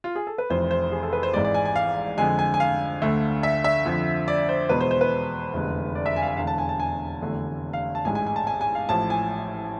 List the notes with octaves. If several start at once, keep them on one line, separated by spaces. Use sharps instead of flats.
F4
G#4
A4
B4
F1 F2 E3 C5
C5
G#4
A4
B4
C5
G#1 G#2 E3 G#3 D5
D5
G#5
G#5
F5
F2 D3 G#3 G#5
G#5
G#5
F5
D2 D3 A3
E5
E5
F2 D3 F3
D5
C5
E2 B2 G#3 B4
C5
C5
B4
F1 E2 D3 G#3
D5
E5
G#5
F5
G#5
E1 E2 D3 F5
A5
G#5
A5
G#5
F1 E2 D3 A3
F5
A5
A1 G#2 G#3 G#5
G#5
G#5
A5
G#5
G#5
F5
A1 A2 F3 A5
G#5